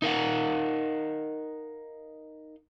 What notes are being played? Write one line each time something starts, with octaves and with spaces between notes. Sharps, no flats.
D#4 A#4 F5 F#5